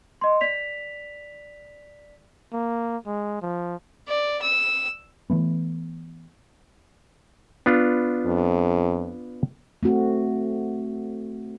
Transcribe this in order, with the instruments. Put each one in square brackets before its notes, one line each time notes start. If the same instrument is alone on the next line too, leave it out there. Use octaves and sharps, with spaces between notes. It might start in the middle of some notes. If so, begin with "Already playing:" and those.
[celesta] D#5 C6
D5 B6 F7
[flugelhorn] A#3
G#3
F3
[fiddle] D5
E6
[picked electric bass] E3 F#3 A3 B3
[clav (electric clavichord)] B3 D4 F4
[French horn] F2
[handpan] A3 C4 F#4